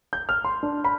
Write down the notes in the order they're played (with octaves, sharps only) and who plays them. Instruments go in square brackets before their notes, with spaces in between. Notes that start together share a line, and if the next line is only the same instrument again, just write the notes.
[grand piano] G6
F6
C6
D4
B5